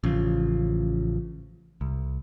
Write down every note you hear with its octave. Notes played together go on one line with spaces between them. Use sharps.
A1 C#3 F3
C2